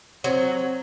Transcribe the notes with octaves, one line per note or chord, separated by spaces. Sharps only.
F#3 C4